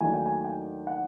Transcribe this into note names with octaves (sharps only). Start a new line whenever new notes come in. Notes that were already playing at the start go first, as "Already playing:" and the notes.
D#2 D#3 F#3 A3 D4 G#5
G5
G#5
G5
F#5